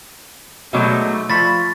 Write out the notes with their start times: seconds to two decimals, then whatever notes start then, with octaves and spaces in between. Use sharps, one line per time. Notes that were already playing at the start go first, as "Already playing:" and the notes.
0.73 B2 F#3 G#3 A3 D#4 D6
1.30 F3 B5 C#6 A6 B6